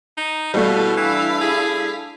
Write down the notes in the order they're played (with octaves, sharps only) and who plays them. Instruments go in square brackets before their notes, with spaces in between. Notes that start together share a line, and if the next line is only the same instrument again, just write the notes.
[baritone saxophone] D#4
[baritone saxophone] B2 [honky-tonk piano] G3 A3 [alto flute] E4 [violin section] F5 A5
[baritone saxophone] E3 [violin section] D4 F5 B6
[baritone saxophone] G#4